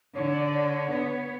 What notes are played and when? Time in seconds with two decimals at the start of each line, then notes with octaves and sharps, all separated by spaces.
0.15 D3 C#5
0.34 D5
0.46 D5
0.53 C#5
0.92 B3